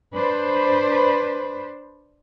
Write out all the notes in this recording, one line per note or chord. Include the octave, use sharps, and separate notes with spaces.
D4 B4 C5